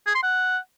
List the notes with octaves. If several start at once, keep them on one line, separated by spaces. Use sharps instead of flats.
G#4
C6
F#5